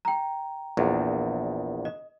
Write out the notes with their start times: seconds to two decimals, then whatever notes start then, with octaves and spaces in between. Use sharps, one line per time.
0.05 G5 A#5
0.77 A#1 E2
1.85 D#5